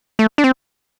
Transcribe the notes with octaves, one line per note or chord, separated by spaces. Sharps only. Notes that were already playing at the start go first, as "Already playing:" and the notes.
A3
D4
C4